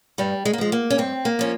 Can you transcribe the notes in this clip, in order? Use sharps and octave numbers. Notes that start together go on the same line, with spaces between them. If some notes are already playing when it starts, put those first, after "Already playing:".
G2 G3
G#3
A#3
F3 G#3
A#3
C#4
G2 C4
A#3
F3 C#4